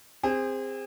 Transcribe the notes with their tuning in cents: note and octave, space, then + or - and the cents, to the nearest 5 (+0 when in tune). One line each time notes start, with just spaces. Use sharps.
C4 +0 G#4 -30